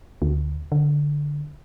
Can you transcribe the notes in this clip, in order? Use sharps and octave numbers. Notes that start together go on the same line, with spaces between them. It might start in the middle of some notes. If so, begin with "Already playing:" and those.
D2
D3